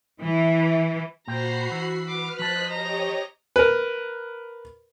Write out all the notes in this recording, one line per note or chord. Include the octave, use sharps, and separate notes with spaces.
E3
A#2 F#4 C5 G5 A#5 B5 C7
E3
B4 D6 F6
F3 C5 D#5 A5 F#6 B6
G4 C#5 D#5 A#5
A#4 B4